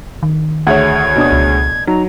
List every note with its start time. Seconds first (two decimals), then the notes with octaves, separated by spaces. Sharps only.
0.23 D#3
0.67 D2 G#4 C#5 E5 F#5 G#6
1.16 B2 D4 D#6
1.32 C#2
1.87 F#3 D#4 A#5